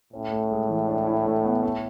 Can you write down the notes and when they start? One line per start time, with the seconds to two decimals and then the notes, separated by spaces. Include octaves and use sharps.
0.13 A2 C#4
0.32 A3
0.51 G#3
0.69 E3
0.88 D4
1.07 E4
1.26 A3
1.45 B3
1.63 A3